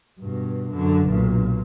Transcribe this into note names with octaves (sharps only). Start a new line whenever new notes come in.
G2 B2
F#2 D3
B1 A#2